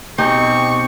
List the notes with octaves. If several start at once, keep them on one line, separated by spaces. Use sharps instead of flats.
B2 C4 D#4 G4 G#5 C#6